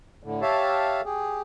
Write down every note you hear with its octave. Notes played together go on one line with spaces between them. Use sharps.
A2 D3
G4 C#5 E5 F5 A5
G4 G#4